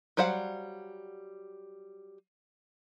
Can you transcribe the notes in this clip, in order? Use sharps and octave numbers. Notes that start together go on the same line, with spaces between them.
F#3 G3 C5 F5 F#5